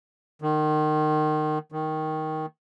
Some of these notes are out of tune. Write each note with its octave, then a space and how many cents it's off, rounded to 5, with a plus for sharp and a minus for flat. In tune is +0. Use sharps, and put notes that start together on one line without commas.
D#3 -25
D#3 +5